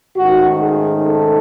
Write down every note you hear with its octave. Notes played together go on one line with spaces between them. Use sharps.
G#2 D#3 A3 C#4 F#4
G#4
A4